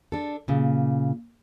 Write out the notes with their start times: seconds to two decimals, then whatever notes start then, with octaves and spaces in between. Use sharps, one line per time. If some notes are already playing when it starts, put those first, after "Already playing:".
0.12 D4 A4
0.48 A#2 C#3